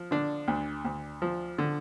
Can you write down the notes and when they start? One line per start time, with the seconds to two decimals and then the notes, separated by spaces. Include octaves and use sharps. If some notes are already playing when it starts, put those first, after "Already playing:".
Already playing: F3
0.11 D3 D4
0.48 D2
0.85 D2
1.22 F3
1.58 D3